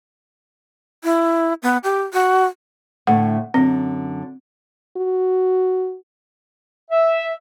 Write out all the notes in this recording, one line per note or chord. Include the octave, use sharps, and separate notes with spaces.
E4
B3
G4
F#4
A2 D3 A3 F#5
F#2 D3 C4
F#4
E5